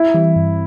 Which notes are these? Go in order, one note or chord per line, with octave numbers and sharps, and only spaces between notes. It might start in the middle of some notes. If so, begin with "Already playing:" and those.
Already playing: E4
E3 G3 C4
G2